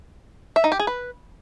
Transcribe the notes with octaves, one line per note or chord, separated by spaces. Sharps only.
E5
D#4
G4
G#4
B4